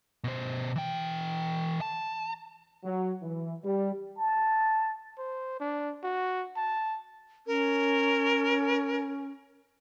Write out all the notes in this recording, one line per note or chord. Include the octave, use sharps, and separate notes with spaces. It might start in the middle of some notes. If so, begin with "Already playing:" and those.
B2 C5
E3 G5
A5
F#3
E3
G3
A5
C5
D4
F#4
A5
C#4 A#4